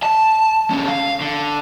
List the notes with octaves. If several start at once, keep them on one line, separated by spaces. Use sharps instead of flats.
A5
D3 C#4
F5
D3